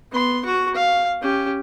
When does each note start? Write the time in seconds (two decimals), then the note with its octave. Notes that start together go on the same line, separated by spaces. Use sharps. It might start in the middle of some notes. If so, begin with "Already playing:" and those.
0.11 B3 C6
0.45 F#4 C#6
0.75 F5
1.21 C#4 G4